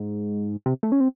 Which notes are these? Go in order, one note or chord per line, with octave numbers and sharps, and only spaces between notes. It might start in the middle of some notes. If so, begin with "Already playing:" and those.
Already playing: G#2
C3
A3
C#4
C4